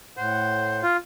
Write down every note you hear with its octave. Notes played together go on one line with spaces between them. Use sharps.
A2 C5 F#5
F4